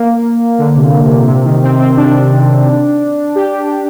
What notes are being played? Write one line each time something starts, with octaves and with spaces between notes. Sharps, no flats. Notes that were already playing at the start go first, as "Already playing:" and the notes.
Already playing: A#3
D3
C3
A#2
A#2
C3
C3
D#3
C4
C4
D4
G4